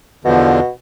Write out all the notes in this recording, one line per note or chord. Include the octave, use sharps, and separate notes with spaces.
E2 B2 D3 F3